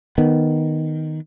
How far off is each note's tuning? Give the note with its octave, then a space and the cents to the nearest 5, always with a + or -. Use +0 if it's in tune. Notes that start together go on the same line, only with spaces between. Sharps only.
D#3 +0 B3 +0